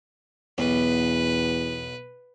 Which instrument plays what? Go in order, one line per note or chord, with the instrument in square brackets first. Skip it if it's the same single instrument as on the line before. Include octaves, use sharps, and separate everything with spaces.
[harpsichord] B1 [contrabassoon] E2 [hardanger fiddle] B4